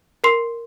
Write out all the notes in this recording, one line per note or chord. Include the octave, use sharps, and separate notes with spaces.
A#4 C6 C7